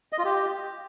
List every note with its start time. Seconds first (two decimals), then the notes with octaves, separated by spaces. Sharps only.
0.13 D#5
0.19 F4
0.24 G4